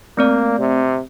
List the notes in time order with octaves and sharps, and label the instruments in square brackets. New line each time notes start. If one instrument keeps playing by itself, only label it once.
[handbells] A3 C4 D5 [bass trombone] A#3
[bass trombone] C3